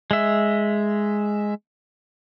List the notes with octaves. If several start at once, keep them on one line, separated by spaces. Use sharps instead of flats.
G#3 E5